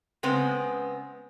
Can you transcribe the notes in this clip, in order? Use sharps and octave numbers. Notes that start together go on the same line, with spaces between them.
C#3 G#3 B3 C4